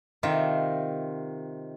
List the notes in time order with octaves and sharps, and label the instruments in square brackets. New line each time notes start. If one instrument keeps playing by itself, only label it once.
[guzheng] C3 D#3 F4 E5